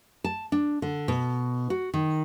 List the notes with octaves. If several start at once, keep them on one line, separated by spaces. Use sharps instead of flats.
A5
D4
D3
B2
F#4
D#3